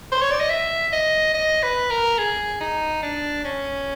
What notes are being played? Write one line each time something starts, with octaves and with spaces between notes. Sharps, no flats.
C5
C#5
D5
D#5
E5
D#5
D#5
B4
A#4
G#4
D#4
D4
C#4